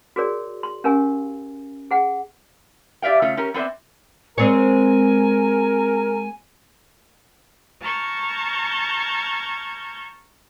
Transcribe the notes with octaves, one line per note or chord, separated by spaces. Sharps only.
F#4 G#4 A#4 C#5 D5
C6
C#4 G4 A#4 F5 G#5
G#4 F#5 G5
G4 D5 E5 F5 G5
C#3 A3 C#4 F4
C#4 G4 A#4
B3 C4 C5 D5 E5
G#3 C4 A#4 C#5 G#5
A5 A#5 C#6 F6 G6 G#6